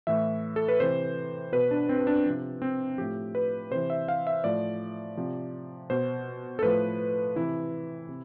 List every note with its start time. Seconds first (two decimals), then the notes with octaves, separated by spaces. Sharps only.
0.07 A2 E3 E5
0.56 A4
0.68 B4
0.80 C3 E3 C5
1.52 B2 B4
1.71 D4
1.89 C4
2.07 D4
2.26 C3 F3
2.62 C4
2.98 A2 F3 G4
3.35 B4
3.71 C3 E3 C5
3.90 E5
4.08 F5
4.27 E5
4.44 A2 F3 D5
5.17 C3 F3
5.90 B2 C5
6.59 A4
6.63 A2 F3 B4
7.36 C3 E3 E4
8.09 C3